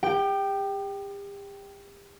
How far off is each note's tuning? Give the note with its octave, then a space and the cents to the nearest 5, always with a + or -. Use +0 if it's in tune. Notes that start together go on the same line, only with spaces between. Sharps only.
G4 +40 G5 -5